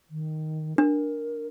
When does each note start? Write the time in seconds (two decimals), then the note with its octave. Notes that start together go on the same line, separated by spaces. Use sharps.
0.11 D#3
0.78 D4 A#4